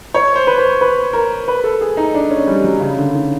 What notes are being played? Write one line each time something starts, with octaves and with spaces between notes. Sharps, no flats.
C#5
C5
B4
C5
B4
A#4
B4
A4
G#4
D#4
D4
C#4
G3
F#3
C#3
D3
D#3